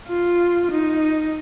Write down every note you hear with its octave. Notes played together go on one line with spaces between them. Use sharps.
F4
D#4